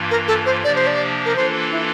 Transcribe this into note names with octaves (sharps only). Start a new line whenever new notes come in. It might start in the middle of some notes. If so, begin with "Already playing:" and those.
Already playing: G2 E3 A#3 F4
A#4
A4
C5
C3 F3 A#3 D4 G4 D5
C5
D5
A#4
E3 A#3 D4 F4 A4 C5
E4